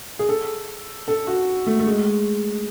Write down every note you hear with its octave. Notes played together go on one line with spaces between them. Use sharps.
G#4
A4
A4
F#4
A3
A3
G#3